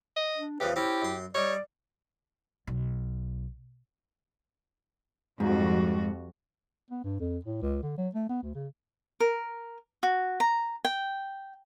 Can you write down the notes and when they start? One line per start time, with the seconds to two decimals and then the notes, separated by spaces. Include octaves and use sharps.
0.16 D#5
0.38 D4
0.60 E2 C#3 F3 G4 B4
0.76 C4 C#4 E4 G4
1.02 F#2 C6
1.35 G3 D#4 C#5 D5
2.67 B1
5.40 F2 G#2 G3 F#4
6.90 B3
7.04 G2
7.20 F2
7.45 A2
7.62 C#2
7.83 D3
7.98 F#3
8.14 A3
8.29 B3
8.43 D2
8.55 C#3
9.20 A#4
10.03 F#4
10.40 A#5
10.85 G5